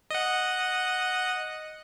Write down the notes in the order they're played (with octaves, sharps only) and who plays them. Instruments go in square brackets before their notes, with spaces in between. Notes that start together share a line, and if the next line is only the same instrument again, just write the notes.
[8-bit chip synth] D#5 F#5